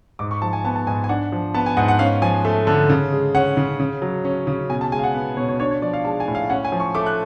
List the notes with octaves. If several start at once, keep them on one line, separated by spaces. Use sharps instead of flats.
G#2 D6
C#6
F3 A5
G#5
B3 A5
A5
G#2 G#5
G#5
D4 F#5
F3
B3 A5
G#5
G#2 F#5
F#5
C#4 F5
F3 G#5
A3
D3
C#3
G#3
C#4 F#5
C#3
C#3
F#3
C#4
C#3
B2 G#5
A5
G#3 G#5
F5
F#5
B3
B2 C#5
C#5
D4 C#5
C#5
F3 D5
F5
G#3 A5
G#5
A2
F5
C#4 F#5
G#5
F3
C#6
A3 D6
F#6